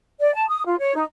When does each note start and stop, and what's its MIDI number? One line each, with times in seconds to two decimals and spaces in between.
0.21 0.32 74
0.35 0.45 81
0.48 0.62 87
0.66 0.77 65
0.79 0.93 73
0.95 1.04 63